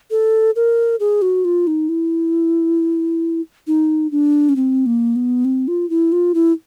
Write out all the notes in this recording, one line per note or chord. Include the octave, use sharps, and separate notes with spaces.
A4
A#4
G#4
F#4
F4
D#4
E4
D#4
D4
C#4
C4
A#3
B3
C4
F4
E4
F4
E4